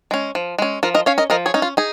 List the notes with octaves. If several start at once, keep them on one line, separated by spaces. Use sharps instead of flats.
G#3 C#4
F3
G#3 C#4
F3 F4 A#4
A#4 D#5
C#4 C#5 F5
A#4 D#5
F3 A#4 D#5
G#4 C#5
C#4 D#4
F4
D#4 G#4